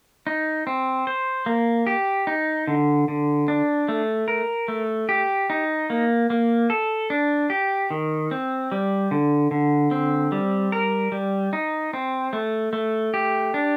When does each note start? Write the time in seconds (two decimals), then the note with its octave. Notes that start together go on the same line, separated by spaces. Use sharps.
0.27 D#4
0.67 C4
1.07 C5
1.46 A#3
1.87 G4
2.27 D#4
2.67 D3
3.08 D3
3.48 D4
3.88 A3
4.28 A#4
4.68 A3
5.09 G4
5.50 D#4
5.90 A#3
6.30 A#3
6.70 A4
7.10 D4
7.50 G4
7.90 D#3
8.31 C4
8.72 G3
9.11 D3
9.51 D3
9.91 C4
10.32 G3
10.72 A#4
11.12 G3
11.53 D#4
11.93 C4
12.33 A3
12.73 A3
13.14 G4
13.54 D4